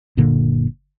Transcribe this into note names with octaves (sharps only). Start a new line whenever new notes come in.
F#1 A#2 D3 A#3